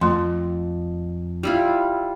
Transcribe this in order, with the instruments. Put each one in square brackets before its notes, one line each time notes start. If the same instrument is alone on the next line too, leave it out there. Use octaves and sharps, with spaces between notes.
[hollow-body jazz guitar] F2 [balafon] A3 C6
[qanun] G3 E4 F4